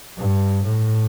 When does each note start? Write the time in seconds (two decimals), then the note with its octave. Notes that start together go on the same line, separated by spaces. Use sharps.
0.17 G2
0.63 A2